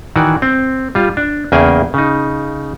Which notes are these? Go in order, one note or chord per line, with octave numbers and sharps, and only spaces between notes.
D#3 E3 F#4 D5
C4
G3 F4
D4
E2 C#3 A#3 G#4 G5 G#5
C#3 D#4